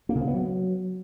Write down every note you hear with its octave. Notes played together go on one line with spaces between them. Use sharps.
A#3
C#3
C4
B3
F#3